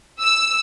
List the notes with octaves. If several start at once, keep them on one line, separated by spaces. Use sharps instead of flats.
E6